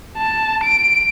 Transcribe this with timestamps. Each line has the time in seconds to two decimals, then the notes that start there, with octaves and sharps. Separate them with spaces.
0.17 A5
0.64 D7